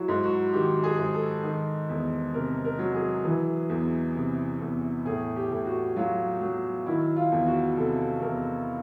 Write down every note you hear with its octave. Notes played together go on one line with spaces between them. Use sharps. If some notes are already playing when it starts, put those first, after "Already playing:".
Already playing: F#3 E4 F#4
G#2
F#4
D#3 G4
G#4
G#2
A4
D#3
E2
C3 A#4
A#4
F#3
G#4
E3
E2
C3
E2
A2 G#4
G4
A2
F#4
F#3 F4
F#3
D#3 E4
F4
E2
F#4
C3 A4
E2 A#4